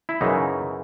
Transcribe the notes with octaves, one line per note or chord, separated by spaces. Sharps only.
E4
F#2 C#3 E3 D#4